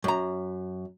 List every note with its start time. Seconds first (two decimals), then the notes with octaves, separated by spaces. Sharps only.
0.04 F#2 A#5